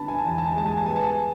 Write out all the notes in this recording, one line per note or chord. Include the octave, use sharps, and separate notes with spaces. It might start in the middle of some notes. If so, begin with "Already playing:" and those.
Already playing: D3 B3 A5 B5
G#5
A5
E2 G#5
A5
G#5
G#3 A5
G#5
A5
B3 G#5
A5
G#5